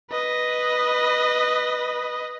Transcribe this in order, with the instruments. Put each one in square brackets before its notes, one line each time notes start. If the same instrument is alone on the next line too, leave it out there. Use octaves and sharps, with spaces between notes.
[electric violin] B4 D#5